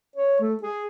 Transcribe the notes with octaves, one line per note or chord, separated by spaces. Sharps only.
C#5
A3
G#4